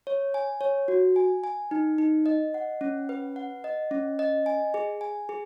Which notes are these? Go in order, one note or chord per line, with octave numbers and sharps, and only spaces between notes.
C#5
G#5
C#5
F#4
G#5
G#5
D#4
D#4
D#5
F#5
C#4
B4
F#5
D#5
C#4
D#5
G#5
G#4
G#5
G#4